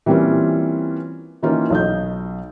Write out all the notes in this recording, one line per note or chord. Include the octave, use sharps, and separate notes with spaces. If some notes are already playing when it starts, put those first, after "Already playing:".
E3 G3 A#3 C4 C#4 F4
D#3 E3 A#3 C#4 D#4 F4
B1 D#5 G6